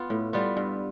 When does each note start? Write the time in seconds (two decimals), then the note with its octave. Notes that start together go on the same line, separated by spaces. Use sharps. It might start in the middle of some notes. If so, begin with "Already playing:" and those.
Already playing: B3 F4
0.10 A2
0.33 G3 B3 F4
0.57 G2